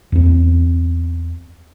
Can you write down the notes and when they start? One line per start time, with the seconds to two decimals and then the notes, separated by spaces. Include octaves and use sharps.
0.12 E2 C4